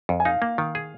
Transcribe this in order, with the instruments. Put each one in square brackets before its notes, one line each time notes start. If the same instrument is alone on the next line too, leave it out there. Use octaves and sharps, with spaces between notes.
[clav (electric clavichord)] F2
[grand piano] G#5
[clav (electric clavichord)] D#4 [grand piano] F5
[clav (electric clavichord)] A#3
D#3
G#4